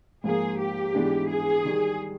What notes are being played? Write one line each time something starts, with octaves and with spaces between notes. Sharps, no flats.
G#2 F3 A#3 G#4
G4
G#2 E3 G#3 B3 D4
G#4
D#3 G3